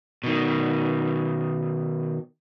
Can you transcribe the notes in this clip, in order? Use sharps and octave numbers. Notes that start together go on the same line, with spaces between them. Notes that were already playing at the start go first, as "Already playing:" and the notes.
B2 D#3